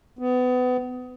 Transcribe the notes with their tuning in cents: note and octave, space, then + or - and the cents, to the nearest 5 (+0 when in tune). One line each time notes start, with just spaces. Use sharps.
B3 +30